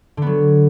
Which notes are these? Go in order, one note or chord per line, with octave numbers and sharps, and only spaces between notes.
D3 F#3 B3